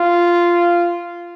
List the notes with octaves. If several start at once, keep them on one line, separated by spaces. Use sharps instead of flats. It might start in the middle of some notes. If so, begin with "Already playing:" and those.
Already playing: F4